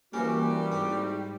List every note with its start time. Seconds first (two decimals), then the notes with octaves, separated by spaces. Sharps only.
0.14 C2 E3 G3 A#3 C#4 F#4 D6
0.72 G#2 C4